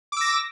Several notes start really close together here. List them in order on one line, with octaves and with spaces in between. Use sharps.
D6 E6 A#6